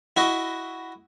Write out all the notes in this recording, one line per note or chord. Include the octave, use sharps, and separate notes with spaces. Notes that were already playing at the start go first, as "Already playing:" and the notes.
E4 F#4 D#5